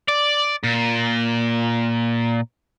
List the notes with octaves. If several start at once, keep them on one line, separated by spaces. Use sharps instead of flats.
D5
A#2